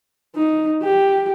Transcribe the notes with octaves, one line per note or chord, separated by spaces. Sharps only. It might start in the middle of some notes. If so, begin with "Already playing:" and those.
D#4
G4